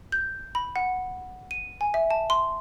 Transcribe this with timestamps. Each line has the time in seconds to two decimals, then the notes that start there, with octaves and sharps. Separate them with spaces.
0.12 G6
0.55 B5
0.76 F#5
1.51 D#7
1.81 G#5
1.94 E5
2.11 A5
2.30 C6